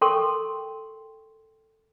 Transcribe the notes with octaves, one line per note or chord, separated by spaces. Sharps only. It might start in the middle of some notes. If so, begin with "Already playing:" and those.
A4 A#4 G5 C6 C#6